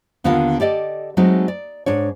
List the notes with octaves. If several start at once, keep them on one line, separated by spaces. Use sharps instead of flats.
D#2 D3 B3 F4 A#4 F5
G4 A4 D5 D#5
F#3 G#3 A3 C4 D#4 F#4
D5
G#2 D4 C#5